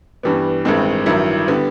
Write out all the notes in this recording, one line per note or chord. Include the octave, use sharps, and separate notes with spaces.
G2 E3 G3 B3
A1 G2 D#3 G#3 C4
A1 G2 D#3 F#3 E4
D3 G3 B3